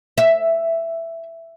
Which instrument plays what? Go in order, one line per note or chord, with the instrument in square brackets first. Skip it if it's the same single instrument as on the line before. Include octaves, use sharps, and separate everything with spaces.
[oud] E5